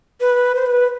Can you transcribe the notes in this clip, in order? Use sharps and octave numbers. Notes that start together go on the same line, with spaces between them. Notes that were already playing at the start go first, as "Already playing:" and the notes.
B4
C5
B4